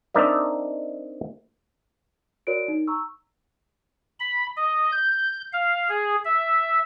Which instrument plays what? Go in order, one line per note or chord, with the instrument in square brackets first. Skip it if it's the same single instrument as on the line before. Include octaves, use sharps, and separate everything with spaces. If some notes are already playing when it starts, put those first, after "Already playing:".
[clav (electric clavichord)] C4 D4 D#4 A#4 D5 E5
[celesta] F#4 A#4 C#5 D5 D7
D#4
A#5 C#6 E6
[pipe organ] B5
D#5
G6
F5
G#4
E5